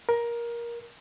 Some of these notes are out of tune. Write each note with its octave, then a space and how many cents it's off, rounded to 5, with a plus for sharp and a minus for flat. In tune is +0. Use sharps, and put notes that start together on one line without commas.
A#4 +15